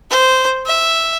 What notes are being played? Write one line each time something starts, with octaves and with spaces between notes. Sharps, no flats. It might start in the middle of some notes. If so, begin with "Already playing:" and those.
C5
E5